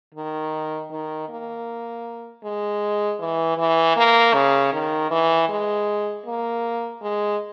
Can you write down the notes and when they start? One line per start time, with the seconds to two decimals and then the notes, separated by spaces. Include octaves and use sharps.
0.14 D#3
0.91 D#3
1.29 A#3
2.44 G#3
3.19 E3
3.58 E3
3.97 A#3
4.34 C#3
4.73 D#3
5.11 E3
5.49 G#3
6.26 A#3
7.02 G#3